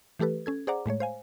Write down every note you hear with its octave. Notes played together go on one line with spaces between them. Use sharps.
E3 A3 G4 A4 B4
C#4 A4 G#6
G#4 C5 D5 F#5 A#5 D6
A2 G#3 A3 C#5
C5 F5 G#5